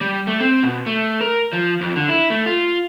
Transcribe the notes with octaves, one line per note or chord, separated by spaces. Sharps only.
G3
A3
C4
B2
A3
A#4
F3
F2
D3
E4
A3
F4